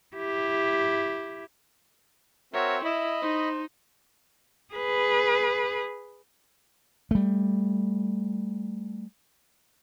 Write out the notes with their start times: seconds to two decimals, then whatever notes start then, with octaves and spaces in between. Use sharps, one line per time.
0.16 E4 G4
2.54 C4 F#4 A#4 C#5 E5
2.84 E4 D#5 E5 B5
3.22 D#4 C5
4.74 G#4 B4
7.11 G3 A3